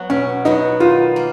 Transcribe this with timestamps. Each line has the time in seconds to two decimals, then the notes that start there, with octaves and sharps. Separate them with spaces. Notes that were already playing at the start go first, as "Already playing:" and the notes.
Already playing: F#3 B3 F#4
0.10 B2 C#4
0.45 F#3 B3 D#4 F#4
0.80 D#3 F4
1.16 A#3